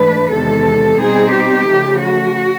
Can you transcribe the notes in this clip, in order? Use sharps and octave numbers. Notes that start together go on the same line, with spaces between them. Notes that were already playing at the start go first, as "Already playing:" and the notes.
Already playing: G#2 E3 A3 D4 B4
E2 C3 D#3 G#3 A4
B2 G3 C4 D#4 G#4
G4
C#3 F3 A3
F#4